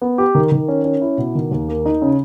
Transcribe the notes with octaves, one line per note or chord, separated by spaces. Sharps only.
B3
G4
D#3
D#3
C#4
C#4
E4
B2
D#3
D#2
A#3
D#4
C#3